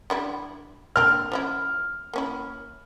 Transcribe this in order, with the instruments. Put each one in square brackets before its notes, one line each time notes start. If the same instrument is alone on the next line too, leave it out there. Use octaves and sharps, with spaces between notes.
[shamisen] D3 G3 E4
[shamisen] A#3 C4 D4 [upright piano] F6
[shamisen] F3 C#4 E4
A#3 C#4 E4